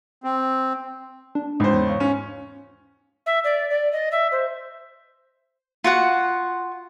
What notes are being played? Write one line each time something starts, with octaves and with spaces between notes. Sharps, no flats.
C4
D4
C#2 G#2 C5
E2 C#5
C#5 F5 C#6
C#4
E5
D5
D5
D#5
E5
C5
F4 F#4 F#5